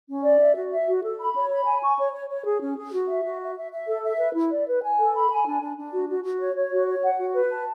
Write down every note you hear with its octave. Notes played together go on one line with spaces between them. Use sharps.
C#4
D5
E5
F#4
E5
F#4
A4
B5
C#5
B5
G#5
C#6
C#5
C#5
C#5
G#4
C#4
G#4
F#4
E5
F#4
E5
E5
E5
A4
E5
B4
E4
D5
B4
G#5
A4
B5
G#5
D4
D4
D4
F#4
F#4
F#4
C#5
C#5
F#4
C#5
F#5
F#4
B4
A5